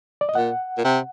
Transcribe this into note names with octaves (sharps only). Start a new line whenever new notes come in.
D5
D#5
A#2 F#5
A#2
C3